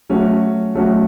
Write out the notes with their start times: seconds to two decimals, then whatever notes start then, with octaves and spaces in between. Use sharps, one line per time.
0.09 F#3 A3 C#4 F#4
0.75 F#3 A3 C#4 F#4